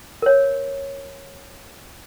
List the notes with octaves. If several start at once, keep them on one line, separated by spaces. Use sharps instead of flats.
A#4 C#5